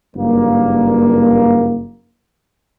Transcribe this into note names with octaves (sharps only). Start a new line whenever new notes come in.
F#1 G2 A#3